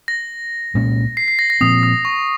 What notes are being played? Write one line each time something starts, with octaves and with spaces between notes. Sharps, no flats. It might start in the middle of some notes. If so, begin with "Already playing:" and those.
A#6
C2 A#2 G#3 C#4
C7
C7
A#6
A#6
A#2 F3 C4 D#6
D#6
C#6